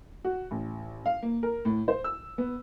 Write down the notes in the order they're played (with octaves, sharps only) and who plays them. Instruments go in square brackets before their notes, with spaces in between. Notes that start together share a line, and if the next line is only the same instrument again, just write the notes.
[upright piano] F#4
A1
F5
A#3
A#4
A2
C5
E6
B3